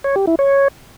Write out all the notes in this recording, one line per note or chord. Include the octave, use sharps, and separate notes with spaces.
C#5
G4
E4
C#5